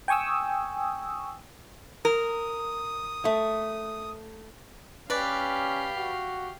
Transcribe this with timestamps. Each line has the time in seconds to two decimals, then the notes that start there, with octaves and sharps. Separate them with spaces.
0.08 G5 G#5 C#6 D#6 E6
2.05 A#4 D#6
3.25 A3
5.10 C#4 G4 B4 D5 F5
5.97 F#4